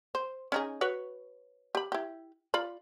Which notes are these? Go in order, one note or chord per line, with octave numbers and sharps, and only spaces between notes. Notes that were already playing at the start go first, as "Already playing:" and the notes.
C5
C#4 D#4 G#4
F#4 B4 C#5
G4 B5
E4 G4
F4 D5 B5